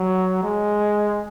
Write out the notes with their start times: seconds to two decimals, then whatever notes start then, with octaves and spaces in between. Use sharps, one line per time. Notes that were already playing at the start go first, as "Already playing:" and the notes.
Already playing: F#3
0.43 G#3